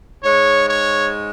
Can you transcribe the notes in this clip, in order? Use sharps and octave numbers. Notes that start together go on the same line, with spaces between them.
G#2 G#3 C#5
C#5